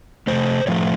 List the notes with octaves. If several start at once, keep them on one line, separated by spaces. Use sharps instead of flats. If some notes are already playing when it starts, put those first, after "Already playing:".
C3 E3 A3 C5
A2 F3 A3 C#5